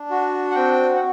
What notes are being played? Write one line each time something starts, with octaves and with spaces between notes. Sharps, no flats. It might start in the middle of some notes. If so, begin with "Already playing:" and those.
Already playing: D4
F#4
F#5
C4 G5
F#5